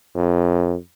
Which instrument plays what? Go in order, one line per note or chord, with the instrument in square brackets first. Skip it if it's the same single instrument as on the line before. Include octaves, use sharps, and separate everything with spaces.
[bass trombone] F2